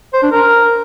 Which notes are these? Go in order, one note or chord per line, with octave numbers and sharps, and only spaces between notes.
C5
D4
A#4